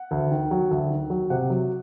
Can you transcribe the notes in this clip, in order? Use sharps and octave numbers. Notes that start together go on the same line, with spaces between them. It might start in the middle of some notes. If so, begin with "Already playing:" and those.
Already playing: F#5
D2
D#3
F#3
D2
D#3
F#3
C3 F#5
F#3